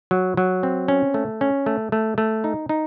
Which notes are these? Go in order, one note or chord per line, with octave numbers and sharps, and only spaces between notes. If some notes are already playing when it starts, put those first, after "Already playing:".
F#3
F#3
C4
C#4
A3
C#4
A3
A3
A3
D#4
D#4